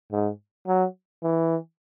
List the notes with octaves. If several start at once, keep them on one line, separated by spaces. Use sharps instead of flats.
G#2
F#3
E3